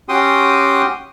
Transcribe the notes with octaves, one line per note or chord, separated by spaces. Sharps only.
C#4 F#4 G4 G5 C6 D#6